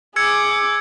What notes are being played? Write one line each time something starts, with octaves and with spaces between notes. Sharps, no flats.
G#4 D6 E6 G#6 C#7